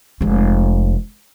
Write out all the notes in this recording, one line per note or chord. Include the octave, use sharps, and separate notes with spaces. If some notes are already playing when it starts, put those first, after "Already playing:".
F1 G#3